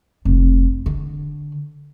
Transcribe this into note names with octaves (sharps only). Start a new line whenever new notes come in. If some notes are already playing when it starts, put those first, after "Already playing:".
F1
D3